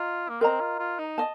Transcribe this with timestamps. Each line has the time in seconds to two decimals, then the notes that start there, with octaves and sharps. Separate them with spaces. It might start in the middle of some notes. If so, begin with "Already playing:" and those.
Already playing: F4 D#5 A#5
0.29 A#3
0.41 C4 A#4 D#5 A#5
0.60 F4
0.79 F4
0.99 D#4
1.18 D#5 A5